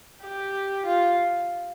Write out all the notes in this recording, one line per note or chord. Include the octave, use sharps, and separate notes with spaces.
G4
F4